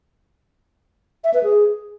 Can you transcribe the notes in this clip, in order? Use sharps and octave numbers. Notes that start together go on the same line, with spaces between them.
E5
B4
G#4